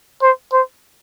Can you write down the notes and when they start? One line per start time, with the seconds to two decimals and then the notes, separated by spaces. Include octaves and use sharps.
0.22 C5
0.53 C5